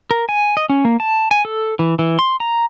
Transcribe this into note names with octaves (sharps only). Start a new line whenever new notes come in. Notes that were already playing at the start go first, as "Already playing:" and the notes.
A#4
G#5
D#5
C#4
A#3
A5
G#5
A4
E3
E3
C6
A#5